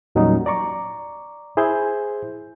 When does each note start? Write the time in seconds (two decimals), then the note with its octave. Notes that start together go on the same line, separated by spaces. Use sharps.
0.15 E2 A#2 F#3 G3 C#4 D#4
0.46 D5 A#5 C#6 D6
1.57 E4 G#4 C5 G#5 G6